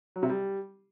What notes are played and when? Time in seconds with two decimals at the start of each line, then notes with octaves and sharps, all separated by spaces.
0.16 F#3
0.23 C3
0.30 G3